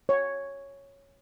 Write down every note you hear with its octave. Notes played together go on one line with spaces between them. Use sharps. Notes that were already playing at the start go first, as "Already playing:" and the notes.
C#5